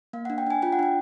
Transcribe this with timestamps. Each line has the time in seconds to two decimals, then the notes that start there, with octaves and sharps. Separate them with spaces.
0.13 A#3 F5
0.25 F#5
0.30 D4
0.38 G5
0.47 D4 G#5
0.62 F4 G5
0.72 F#5
0.79 D4 G5